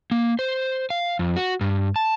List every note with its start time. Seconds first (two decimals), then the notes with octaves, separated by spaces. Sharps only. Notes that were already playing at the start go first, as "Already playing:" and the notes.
0.11 A#3
0.39 C5
0.90 F5
1.19 F2
1.36 F#4
1.61 G2
1.96 A5